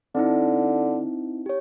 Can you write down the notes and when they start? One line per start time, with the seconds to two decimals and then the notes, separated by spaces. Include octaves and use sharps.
0.15 D3 C4 D#4 E4
1.46 G4 C#5